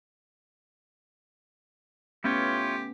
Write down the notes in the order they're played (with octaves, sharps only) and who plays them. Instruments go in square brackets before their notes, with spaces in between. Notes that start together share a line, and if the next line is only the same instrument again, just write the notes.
[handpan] A3 B3 C#4 [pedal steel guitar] E4 F4 C#5 [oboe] G4